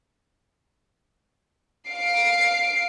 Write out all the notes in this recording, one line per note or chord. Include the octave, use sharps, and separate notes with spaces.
F5 C7 D7